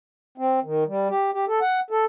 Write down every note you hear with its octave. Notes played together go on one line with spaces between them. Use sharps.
C4
D#3
G3
G4
G4
A4
F#5
A4